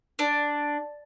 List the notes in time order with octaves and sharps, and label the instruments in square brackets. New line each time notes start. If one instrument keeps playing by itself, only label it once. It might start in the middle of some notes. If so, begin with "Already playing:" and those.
[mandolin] D4